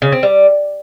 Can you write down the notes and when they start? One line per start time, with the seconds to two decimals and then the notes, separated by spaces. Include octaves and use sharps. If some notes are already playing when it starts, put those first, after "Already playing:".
0.02 C#3
0.12 C4
0.23 G3